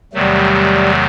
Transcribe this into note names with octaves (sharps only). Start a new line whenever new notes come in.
E2 C3 D#3 F#3 G3 A3